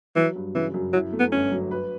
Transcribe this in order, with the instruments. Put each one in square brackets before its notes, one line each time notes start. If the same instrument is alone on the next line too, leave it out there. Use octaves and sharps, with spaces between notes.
[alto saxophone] E3 [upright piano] F#3
[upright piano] G2
[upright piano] C#3 [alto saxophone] E3
[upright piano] F#2
[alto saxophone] F#3 [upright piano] E4
[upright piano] A3
[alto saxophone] B3
[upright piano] G1 [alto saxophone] C#4
[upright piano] F#3
B4